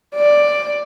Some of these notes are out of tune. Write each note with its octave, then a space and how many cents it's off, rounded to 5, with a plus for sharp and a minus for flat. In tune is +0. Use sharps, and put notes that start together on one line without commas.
D5 +5